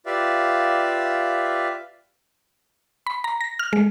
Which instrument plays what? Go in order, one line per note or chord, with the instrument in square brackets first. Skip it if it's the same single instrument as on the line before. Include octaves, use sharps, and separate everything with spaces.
[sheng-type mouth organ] F4 G4 B4 D5 E5 F5
[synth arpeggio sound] B5
A#5
A#6
F6
G#3